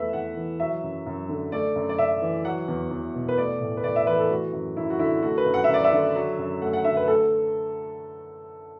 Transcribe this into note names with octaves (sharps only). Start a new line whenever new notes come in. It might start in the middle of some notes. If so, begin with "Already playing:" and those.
Already playing: E2 A3 B4 E5
E2 F#5
E3
F#3 E5
F#2
F#2
D3
A3 D5
F#2
D5
F#2 E5
E3
F#3 F#5
E2
E2
B2
B4
A3 D5
A2
B4
A2 D5
E5
E3 B4
A4
A3 F#4
F#2
F#2 E4
F#4
D3 E4
A3 F#4
B4
F#2
F#5
E5
F#2 D5
E5
D3
F#3
F#2
A3 F#5
F#5
D3 E5
B4
A3 A4